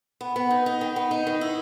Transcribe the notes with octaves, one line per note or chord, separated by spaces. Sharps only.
B3
B3
D#4
D#4
D#3
B3
D#4
D#3
E4